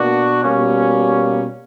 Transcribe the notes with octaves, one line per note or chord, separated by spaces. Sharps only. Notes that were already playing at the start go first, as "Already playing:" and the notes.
Already playing: B2 A#3 D4 F#4
B2 G3 A#3 C#4